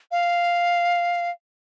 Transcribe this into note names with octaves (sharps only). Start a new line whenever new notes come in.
F5